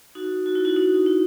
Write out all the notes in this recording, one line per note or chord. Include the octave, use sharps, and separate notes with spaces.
D#4 F#4
F#4
E4
D#4 F#4
D#4 F#4
F#4
E4